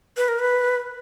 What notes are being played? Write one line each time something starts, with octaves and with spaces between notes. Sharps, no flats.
B4
A#4
B4